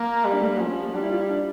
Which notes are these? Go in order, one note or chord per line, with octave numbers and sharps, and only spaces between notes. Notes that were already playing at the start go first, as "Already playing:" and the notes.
Already playing: A#3
G3
D4
A3
A#3
F3 C#4
G3 D4
E4
F4
E4
D4